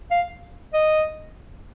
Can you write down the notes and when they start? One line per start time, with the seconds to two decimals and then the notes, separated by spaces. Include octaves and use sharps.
0.11 F5
0.74 D#5